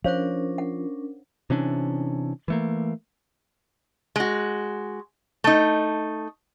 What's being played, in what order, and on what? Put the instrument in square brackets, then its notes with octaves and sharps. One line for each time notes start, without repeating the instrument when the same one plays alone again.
[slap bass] F3 [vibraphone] C#4 D4 A#4 [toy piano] C5 C#5 F5
[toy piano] F#5
[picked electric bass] C3 E3 C#4 D4
E3 A3 A#3
[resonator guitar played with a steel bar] G#3 F#4
A3 D#4